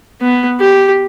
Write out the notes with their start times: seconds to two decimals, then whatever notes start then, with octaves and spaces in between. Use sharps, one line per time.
0.22 B3
0.60 G4